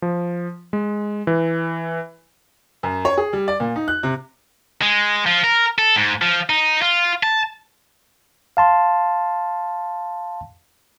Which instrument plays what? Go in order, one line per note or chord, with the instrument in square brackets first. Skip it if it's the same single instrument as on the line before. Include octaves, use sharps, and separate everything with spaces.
[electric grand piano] F3
G#3
E3
[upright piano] F#2
C#5
G#4
G3
D5
A#2
D#4
F#6
C3
[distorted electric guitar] G#3
F3
A#4
A4
G#2
F3
D#4
F4
A5
[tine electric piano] F5 A5 C6